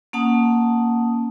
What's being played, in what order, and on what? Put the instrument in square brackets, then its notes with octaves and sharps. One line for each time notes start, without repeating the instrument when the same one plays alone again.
[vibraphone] A#3 C#4 F#5 A5 D#6